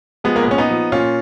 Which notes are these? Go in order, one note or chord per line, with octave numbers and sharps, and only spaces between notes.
F3 G#3 B3
A#3
B3
A#2 C#4
B3 D#4
F3
A#2 C#4 F4